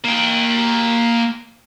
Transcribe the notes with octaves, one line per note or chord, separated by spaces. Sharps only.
A#3 G5